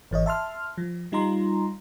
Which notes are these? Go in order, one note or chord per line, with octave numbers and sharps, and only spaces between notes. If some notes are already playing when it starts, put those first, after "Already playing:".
G#1 E3 C#5 D#5
E5 A5 C6 F6
F3
G3 D#4 F4 A#5 C6